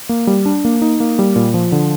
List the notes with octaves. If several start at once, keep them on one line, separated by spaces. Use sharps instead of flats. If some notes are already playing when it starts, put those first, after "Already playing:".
A#3
G3
D4
A#3
D#4
A#3
G3
A#2
F3
D3